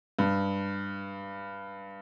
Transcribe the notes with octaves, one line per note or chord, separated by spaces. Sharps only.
G2